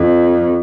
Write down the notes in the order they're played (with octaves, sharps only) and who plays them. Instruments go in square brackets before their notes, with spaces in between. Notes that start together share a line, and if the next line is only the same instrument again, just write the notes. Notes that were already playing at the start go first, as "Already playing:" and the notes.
Already playing: [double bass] F2